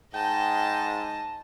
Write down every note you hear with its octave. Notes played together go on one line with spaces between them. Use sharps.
G#2 D#5 G5 A5